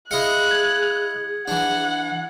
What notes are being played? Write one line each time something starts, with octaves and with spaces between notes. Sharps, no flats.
E4 G#4 D#5 F5 F#6 C#7
G#6
E3 D4 F#5